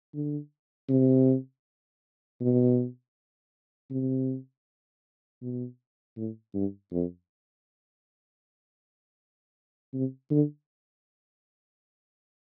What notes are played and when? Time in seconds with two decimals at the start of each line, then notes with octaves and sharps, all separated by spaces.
0.14 D3
0.89 C3
2.41 B2
3.91 C3
5.42 B2
6.17 A2
6.54 G2
6.92 F2
9.94 C3
10.31 D3